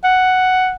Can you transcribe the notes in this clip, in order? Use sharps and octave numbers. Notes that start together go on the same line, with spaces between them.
F#5